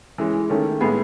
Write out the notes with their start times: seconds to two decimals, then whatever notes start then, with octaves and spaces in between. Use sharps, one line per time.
0.18 E3 G#3 C#4
0.49 D#3 A3 C#4
0.81 A2 G#3 B3 G#4